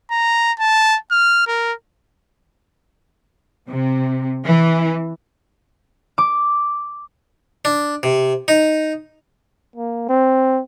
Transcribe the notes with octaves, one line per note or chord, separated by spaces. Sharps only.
A#5
A5
F6
A#4
C3
E3
D6
D4
C3
D#4
A#3
C4